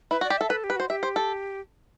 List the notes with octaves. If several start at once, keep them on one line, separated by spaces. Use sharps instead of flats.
E4 B4
F#4
D5
G4
A4 E5
A4 B4
G4
B4
F#4 C5
G4 E5
C5
A4